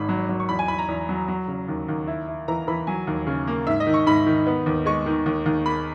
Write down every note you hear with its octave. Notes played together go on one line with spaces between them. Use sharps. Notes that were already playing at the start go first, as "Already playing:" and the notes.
Already playing: G#1 G#2 B5
F#3
F#3
C#6
E2 B5
G#5
E2 B5
A#5
E2
F#3
F#3
C#3
D#2
D#2
E4
E4
E3 A#5
E3 B5
F#3 G#5
D#2
C#3
A#3
G#2 E5
D#5
D#3
C#6
G#2 B5
D#3
B3
D#2
G#3 C#6
D#3
D#2
D#2
A#3 B5